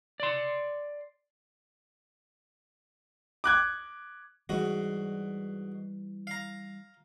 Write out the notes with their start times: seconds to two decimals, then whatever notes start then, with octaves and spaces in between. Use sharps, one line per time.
0.20 D5 C6
3.44 D6 F#6 G#6
4.49 G#2 E3 G3 F#4
6.27 F5 A#5